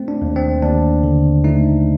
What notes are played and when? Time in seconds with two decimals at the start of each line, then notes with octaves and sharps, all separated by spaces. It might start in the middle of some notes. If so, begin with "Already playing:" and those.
Already playing: A3 C4
0.08 D4
0.22 D#2
0.36 C4
0.62 D#2 D4
1.04 D3
1.44 A3 D#4